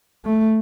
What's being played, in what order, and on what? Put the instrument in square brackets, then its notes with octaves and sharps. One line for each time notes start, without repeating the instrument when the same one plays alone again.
[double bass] A3